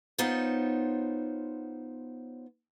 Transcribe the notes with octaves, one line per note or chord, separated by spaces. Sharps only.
B3 D#4 F4 C5 C#5